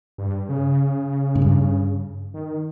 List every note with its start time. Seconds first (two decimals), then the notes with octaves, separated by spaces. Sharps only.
0.18 G2
0.49 C#3
1.35 G#2
1.42 G2
2.34 D#3